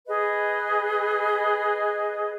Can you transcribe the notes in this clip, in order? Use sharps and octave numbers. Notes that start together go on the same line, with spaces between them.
G#4 B4 D#5